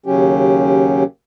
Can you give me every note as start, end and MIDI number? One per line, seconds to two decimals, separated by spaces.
0.06 1.04 39
0.06 1.04 49
0.06 1.04 54
0.06 1.04 61
0.06 1.04 67